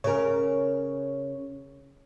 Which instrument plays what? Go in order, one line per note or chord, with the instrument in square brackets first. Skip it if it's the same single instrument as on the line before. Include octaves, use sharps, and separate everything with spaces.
[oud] C#3 A#4 [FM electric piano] C#5